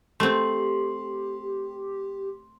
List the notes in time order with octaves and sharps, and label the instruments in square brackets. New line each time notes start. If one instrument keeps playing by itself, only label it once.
[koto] A3 C4 [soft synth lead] G4 [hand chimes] C6